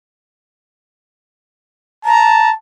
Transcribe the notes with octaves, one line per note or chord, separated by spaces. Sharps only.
A5 A#5